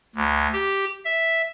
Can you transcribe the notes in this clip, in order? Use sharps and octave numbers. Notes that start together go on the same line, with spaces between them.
D2
G4
E5